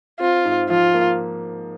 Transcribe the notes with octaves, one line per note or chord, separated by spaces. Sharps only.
C4 F4
G#2
F3 F4
A#3